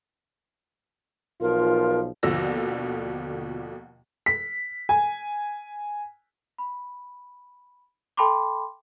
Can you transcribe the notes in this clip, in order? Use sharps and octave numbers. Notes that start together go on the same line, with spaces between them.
B1 F3 F4 A#4
D#2 B2 D3 F3 E6 A#6
B6
G#5
B5
A4 G5 A5 B5 C6 D6